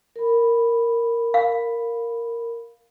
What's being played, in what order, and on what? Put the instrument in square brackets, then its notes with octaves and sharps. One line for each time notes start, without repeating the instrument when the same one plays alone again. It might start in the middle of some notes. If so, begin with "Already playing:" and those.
[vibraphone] A#4 B5
[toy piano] F5